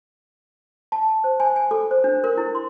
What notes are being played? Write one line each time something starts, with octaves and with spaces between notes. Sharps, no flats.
A5
C5
G#5
G#5
A4
C5
D4
A#4
E4
C6